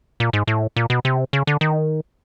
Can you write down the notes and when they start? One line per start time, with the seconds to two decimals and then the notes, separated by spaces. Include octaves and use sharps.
0.20 A#2
0.33 G#2
0.47 A2
0.76 A#2
0.90 B2
1.05 C3
1.33 C#3
1.47 D3
1.61 D#3